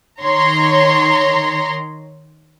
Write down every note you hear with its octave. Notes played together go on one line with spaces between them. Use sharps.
D#3 C#5 A#5 C6